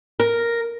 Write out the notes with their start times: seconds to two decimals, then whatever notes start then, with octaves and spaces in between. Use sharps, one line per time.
0.20 A#4